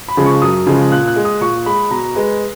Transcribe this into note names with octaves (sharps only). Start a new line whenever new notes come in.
B5
C#3 F3 G#3
C#6
F#2 D#6
C#3 F3 G#3
A#2 F#6
F#6
G#3
D#6
A#2 C#6
G#3 B5
B2 A#5
G#3 B4